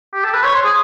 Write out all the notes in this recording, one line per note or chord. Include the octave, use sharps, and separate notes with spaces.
G4
A4
B4
C#5
C5
G#4